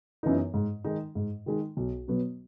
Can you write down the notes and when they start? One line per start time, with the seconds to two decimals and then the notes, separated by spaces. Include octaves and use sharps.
0.23 F#2 E3 B3 D#4
0.54 G#2
0.84 D#3 G#3 D#4
1.15 G#2
1.46 D#3 G#3 D#4
1.77 B1
2.08 B2 F#3 B3